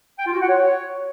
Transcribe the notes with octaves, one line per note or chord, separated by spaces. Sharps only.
G5
F4
F#4
F#5
C#5